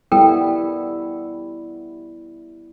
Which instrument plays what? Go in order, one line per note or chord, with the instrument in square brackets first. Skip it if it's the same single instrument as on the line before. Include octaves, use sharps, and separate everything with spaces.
[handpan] G3 B3 E4 [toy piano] A4 A#4 G5